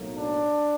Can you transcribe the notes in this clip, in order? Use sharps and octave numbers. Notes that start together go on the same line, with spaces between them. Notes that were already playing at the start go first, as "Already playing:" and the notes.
Already playing: B1 A2 F#3 A#3
D4